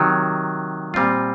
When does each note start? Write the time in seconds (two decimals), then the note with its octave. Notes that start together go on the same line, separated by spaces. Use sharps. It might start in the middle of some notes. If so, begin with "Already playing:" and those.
Already playing: C3 D#3 F#3
0.94 A#2 G3 C4 F4